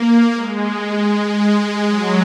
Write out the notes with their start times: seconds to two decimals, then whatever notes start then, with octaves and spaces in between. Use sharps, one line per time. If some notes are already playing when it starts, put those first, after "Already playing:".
Already playing: A#3
0.35 G#3
1.37 G#3
1.88 F#3